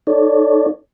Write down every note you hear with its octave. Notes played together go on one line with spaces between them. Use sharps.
D#4 A4 C#5 D5